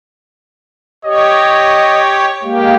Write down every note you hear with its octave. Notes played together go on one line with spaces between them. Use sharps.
G4 C#5 D#5
G#3 A#3 G4